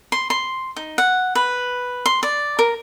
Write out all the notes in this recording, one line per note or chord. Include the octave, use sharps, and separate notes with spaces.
C6
C6
D#4
F#5
B4
C6
D5
A#4